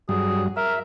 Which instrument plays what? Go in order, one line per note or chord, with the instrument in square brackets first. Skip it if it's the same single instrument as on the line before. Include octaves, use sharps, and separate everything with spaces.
[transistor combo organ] G2 F#3 [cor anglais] G#4
[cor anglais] A#4 [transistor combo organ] E5